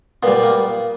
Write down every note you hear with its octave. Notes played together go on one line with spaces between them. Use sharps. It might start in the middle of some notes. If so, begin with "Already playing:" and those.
A#2 G3 B3
A#3